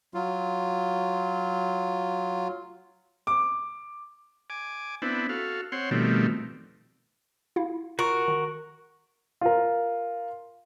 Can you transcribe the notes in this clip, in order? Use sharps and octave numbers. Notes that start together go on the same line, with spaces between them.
F#3 F4
D6
G#5 D6
B3 C4 D4 E4
F#4 A4 F5
C4 C#5 F#5 C6
B2 D#3 F3 G3 A3 C4
E4 F4 F5
F4 F#4 A#4 C#6
D#3
F4 A#4